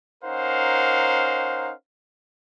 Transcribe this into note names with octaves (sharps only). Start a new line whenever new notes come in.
C#4 D#4 A#4 C5 F5 F#5